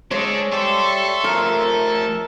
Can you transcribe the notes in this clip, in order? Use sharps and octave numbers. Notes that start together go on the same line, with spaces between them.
G#3 D4 A4 C#5
G4 A4 D5 E5 C6 C#6
F3 A3 A#4